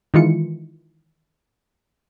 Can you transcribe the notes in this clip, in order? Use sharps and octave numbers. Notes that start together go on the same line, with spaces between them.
D#3 E3 G#3 F4 C#7